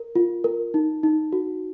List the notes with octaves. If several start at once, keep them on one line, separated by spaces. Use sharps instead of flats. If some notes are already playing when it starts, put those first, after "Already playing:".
Already playing: A#4
F4
A#4
D#4
D#4
F#4